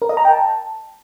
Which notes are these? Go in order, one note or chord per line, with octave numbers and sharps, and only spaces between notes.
A#4
D#5
A#5
G5
A5